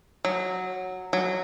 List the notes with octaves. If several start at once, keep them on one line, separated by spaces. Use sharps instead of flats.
F#3
F#3